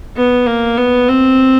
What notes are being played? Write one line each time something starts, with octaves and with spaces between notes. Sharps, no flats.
B3
A#3
B3
C4